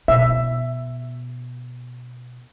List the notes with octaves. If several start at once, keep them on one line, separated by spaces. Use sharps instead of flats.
B2 E5